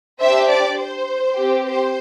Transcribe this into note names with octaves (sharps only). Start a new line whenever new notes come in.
D4 G4 C5 E5
D5
C5
C4 G4
C5